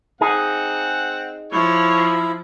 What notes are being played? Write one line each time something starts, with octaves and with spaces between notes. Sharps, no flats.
C4 D#4 G#4 F#5
F3 E4 C#5